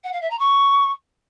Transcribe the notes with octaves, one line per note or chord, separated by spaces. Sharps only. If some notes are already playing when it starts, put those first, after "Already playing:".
F#5
F5
E5
A#5
C#6